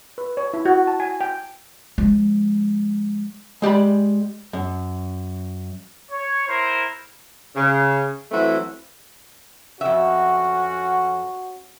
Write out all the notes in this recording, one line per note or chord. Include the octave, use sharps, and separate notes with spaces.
B4
C#5
E4
F#4
A5
G#5
G5
F3 G#3
G#3 G4 D5 B5
F#2
C#5
E4 A#4 C5
C#3
E3 F#3 A3 C4 E4 F#4
F2 C#4 F#4 E5